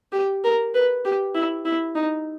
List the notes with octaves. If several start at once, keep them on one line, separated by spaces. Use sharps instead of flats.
G4
A#4
B4
G4
E4
E4
D#4